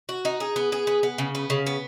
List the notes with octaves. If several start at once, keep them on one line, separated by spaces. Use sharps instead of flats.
F#4
D#4
G#4
B3
G#4
B3
B3
C#3
B3
C#3
B3